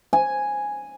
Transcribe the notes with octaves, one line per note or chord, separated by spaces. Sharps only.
G#5